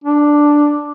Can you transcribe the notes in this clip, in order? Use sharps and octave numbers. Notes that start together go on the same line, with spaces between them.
D4